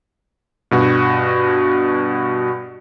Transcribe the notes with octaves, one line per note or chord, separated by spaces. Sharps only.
G2 B2 F#4